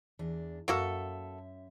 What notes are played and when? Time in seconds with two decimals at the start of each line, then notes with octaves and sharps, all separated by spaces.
0.19 E2 D4
0.68 F#2 A#3 F#4 A4 E5